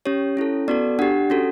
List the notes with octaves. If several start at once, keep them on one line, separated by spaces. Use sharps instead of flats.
C#4 G4 C#5
C#4 E4 A4
B3 F#4 A4 D5
D4 G4 F#5
C#4 F#4 A4